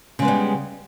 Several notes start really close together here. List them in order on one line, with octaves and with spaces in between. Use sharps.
C#3 G#3 B3 G3